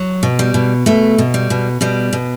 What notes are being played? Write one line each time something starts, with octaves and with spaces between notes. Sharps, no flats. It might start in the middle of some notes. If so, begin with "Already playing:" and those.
Already playing: F#3
B2
G3
B2
B2 A3
B2
G3
B2
B2 G3
B2